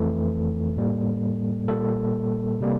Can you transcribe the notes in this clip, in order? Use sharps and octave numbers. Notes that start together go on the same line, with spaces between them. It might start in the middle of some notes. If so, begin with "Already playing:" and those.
Already playing: F2 E3 A3 A4
A2 G3 A#3
A#2 G3 A#3 A4
C3 G3 A#3